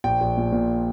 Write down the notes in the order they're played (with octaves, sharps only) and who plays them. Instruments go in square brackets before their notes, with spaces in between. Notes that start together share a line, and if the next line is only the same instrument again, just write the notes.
[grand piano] A#1 G5
A#1
A#2
A#2